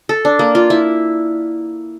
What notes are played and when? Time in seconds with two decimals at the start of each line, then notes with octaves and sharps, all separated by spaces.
0.09 A4
0.25 D4
0.39 A#3
0.55 F4
0.70 E4